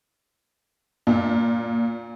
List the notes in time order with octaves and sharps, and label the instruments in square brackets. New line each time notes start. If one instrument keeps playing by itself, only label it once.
[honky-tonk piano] A#2